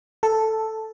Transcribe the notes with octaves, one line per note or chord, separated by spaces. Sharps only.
A4